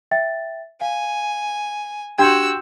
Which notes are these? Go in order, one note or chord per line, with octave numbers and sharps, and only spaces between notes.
E5 G5 A6
F5 G#5
D4 F#4 G4 G5 C6 E6 G6 G#6